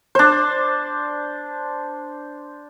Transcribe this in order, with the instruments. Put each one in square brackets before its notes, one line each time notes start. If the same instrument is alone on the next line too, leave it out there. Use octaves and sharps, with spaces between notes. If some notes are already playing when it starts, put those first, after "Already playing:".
[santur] D4 C5